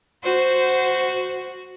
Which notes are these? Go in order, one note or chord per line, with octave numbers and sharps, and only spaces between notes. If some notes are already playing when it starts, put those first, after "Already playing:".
F#4 C5